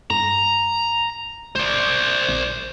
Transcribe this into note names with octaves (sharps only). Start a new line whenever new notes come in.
G2 A#5
G1 C5 D5
A#1